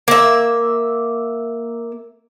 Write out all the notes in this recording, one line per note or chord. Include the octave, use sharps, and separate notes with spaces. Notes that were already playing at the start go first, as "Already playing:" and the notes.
A#3 E5